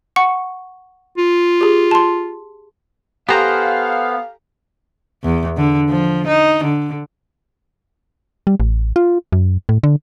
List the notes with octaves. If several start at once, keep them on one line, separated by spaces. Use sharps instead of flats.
F#5 C#6 C#7
F4
G4 G#4
A5 C6
B3 G4 A4 C5 F5 G#5 A#5
E2
D3
F3
D#4
D3
G3
A1
F4
F#2
A2
D3